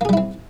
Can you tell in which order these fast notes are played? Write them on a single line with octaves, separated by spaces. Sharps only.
A#3 G#4 G3 E4 C4